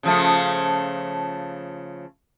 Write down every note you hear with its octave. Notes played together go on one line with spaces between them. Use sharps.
C#3 F3 A3